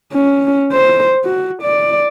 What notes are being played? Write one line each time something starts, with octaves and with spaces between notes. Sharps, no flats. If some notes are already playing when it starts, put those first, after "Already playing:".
C#4
C5
F#4
D5